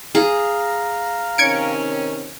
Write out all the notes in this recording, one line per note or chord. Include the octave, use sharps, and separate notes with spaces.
G#4 F5 A#5
C3 D#3 C#4 G#6 C#7 D7